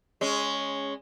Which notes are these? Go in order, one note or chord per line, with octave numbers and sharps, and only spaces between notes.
G#3 C#4